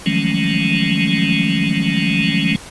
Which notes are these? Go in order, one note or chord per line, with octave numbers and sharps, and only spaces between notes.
D#3 F3 F#3 G#3 A3 C#4